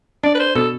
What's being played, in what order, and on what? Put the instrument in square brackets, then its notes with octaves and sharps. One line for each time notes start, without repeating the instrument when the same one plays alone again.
[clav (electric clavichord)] D4 [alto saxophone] D5
[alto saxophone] B4
C5
[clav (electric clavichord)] B2 [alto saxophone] A4